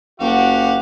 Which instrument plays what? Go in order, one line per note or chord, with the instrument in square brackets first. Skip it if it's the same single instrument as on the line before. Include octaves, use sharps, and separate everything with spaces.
[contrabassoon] F#1 [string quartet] F#4 F#5 [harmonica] G4 F5